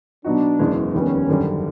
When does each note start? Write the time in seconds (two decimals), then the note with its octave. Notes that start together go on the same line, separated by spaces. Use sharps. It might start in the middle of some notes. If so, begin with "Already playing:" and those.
0.24 B2 F#3 B3 D4 D#4 F#4
0.59 F#1 E2 B2 G#3 C#4
0.95 F1 D#2 D#3 G3 B3 C#4
1.28 G#1 F#2 D3 G3